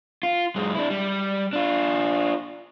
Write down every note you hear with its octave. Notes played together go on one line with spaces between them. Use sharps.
F4
F#2 G#3
D4 E4
G3
D4 F4